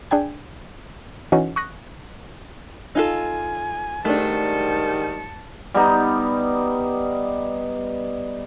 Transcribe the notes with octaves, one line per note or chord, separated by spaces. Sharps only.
D4 G#4 G5 G#5 G#6
E3 C#4 D#4 F#4
C#6 D#6 F#6 A#6
D#4 F4 A4 G#5
G#2 D#3 G3 A3 D4 A5 C#7
G3 B3 D#4